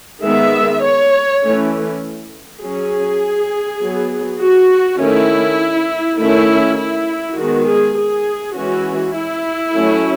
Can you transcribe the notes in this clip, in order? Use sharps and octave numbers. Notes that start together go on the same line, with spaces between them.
D#3 G#3 B3 E5
C#5
E3 A3 C#4
F#3 C#4 G#4
F#3 B3
F#4
D#3 A3 C#4 E4
D#3 A3 C#4 E4
E4
D#3 G#3 B3 F#4
G#4
G#4
E3 G#3 C#4 F#4
E4
F#3 A3 C#4